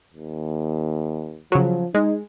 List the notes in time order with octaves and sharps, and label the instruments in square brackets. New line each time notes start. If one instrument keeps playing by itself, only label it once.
[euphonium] D#2
[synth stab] C#3 F#3 [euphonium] F3
[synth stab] G#3 [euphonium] D#4